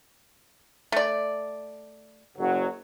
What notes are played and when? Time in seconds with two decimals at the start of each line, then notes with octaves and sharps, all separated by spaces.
0.92 A3 D5
2.37 F#1 F#3